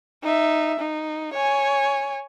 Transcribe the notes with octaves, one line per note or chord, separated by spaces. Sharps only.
D#4 E5
D#4
C#5 G#5